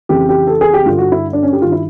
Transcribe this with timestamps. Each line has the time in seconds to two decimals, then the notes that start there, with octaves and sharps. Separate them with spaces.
0.09 F2 C#3 E3 G4
0.29 G4
0.47 A4
0.61 G#4
0.74 G4
0.85 G2 D3 F4
0.98 F#4
1.12 E4
1.33 D4
1.43 C#4
1.53 G4
1.62 G2 D#3 F4
1.72 E4